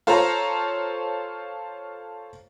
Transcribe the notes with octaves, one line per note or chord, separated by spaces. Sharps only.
F4 A4 C5 C#5 F5 A#5